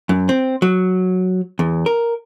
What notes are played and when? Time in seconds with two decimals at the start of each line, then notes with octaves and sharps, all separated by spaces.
0.09 F#2
0.29 C4
0.62 F#3
1.59 E2
1.86 A#4